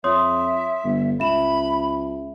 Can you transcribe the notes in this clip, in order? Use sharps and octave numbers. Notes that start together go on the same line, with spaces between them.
F2 C#5 E5 C6 D#6
G1
C#2 E5 B5 E7